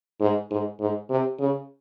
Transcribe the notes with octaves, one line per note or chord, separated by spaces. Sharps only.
G#2
G#2
G#2
C3
C#3